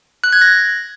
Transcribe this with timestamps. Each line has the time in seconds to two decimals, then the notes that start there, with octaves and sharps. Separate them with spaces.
0.24 F#6
0.33 G#6
0.42 A#6